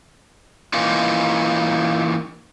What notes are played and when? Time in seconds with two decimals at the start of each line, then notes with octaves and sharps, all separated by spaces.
0.73 E3 A#3 C#4 D#4 F4